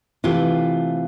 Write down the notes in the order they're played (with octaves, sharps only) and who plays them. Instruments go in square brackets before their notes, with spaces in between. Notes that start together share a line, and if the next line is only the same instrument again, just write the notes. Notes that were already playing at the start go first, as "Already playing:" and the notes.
[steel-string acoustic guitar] C3 E3 A3 F4